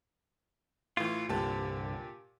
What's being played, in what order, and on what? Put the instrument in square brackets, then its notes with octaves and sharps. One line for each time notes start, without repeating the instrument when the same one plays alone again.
[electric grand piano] A2 E3 [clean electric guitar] F4
[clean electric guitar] C2 G2 D3 [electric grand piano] A#2 G4 A5